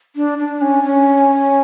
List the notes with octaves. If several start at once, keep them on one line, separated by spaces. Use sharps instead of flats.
D4
D4
C#4
C#4